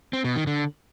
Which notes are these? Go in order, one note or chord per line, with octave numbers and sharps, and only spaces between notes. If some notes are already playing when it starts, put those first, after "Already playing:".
C4
B2
D#3
D3